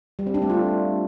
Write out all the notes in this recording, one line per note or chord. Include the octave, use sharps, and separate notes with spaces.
G3
C4
D4
A3
F4